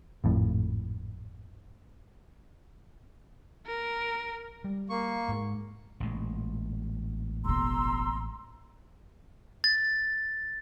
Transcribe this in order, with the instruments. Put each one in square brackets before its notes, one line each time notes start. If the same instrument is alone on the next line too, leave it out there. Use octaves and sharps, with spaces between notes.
[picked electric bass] G#1 F2 A2
[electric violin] A#4
[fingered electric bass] G3
[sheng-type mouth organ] A#3 C#6
[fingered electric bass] G#2 G#3
[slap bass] A1 A#2 G#3
[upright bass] E1 B2 [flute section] A#5 C6 E6
[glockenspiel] A6